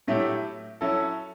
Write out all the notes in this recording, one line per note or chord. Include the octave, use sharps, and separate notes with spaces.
A2 F#3 A3 E4 G4
F#3 C#4 E4 A4